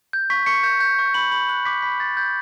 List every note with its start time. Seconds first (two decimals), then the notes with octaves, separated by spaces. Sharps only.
0.13 G6
0.30 C#6 B6
0.46 C#6 C#7
0.63 G6
0.80 G6
0.99 C#6
1.14 B5 F#7
1.31 B5 F#7
1.49 F#6 F#7
1.65 D6 B6
1.82 B5 B6
2.00 B5 A6
2.17 G6